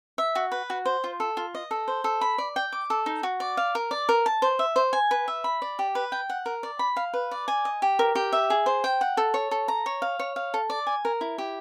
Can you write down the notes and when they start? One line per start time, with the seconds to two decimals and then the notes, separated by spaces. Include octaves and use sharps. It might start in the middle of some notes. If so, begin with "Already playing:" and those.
0.18 E5
0.35 F#4
0.52 B4
0.70 F#4
0.85 C5
1.04 F4
1.20 A4
1.37 F4
1.55 D#5
1.71 A4
1.88 C5
2.04 A4
2.21 B5
2.38 D5
2.56 G5
2.72 D6
2.90 A4
3.06 D#4
3.23 F#4
3.40 D5
3.57 F5
3.75 A#4
3.91 D5
4.09 A#4
4.26 A5
4.42 C5
4.59 E5
4.76 C5
4.93 G#5
5.11 B4
5.28 E5
5.44 B5
5.62 D5
5.79 G4
5.95 B4
6.12 G5
6.30 F#5
6.46 A#4
6.63 D5
6.79 B5
6.97 F5
7.13 B4
7.31 D5
7.48 G#5
7.65 D#5
7.82 G4
7.99 A#4
8.15 G4
8.33 E5
8.50 G#4
8.66 C5
8.84 G5
9.01 F#5
9.17 A4
9.34 C#5
9.51 A4
9.68 A#5
9.86 C#5
10.02 F5
10.19 C#5
10.36 F5
10.54 A4
10.70 D5
10.87 G#5
11.05 A#4
11.21 E4
11.38 G4